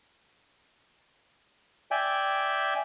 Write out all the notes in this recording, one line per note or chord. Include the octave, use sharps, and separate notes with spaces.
D5 E5 G5 G#5